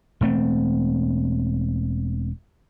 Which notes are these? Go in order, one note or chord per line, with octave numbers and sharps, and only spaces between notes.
E1 G2 A3 C4